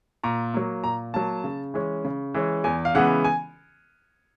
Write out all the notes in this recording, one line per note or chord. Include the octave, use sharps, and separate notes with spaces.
A#2 A#5
F#3 A#3
A#2 A#5
F#3 A#3 A5
C#3
E3 G#3 C#4
C#3
E3 G#3 C#4
E2 G#5
F5
C#3 E3 G#3 B3 F#5
G#5